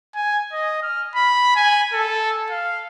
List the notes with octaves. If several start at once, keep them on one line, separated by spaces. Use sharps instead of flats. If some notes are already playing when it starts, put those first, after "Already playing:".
G#5
D#5
F6
B5
G#5
A4
F5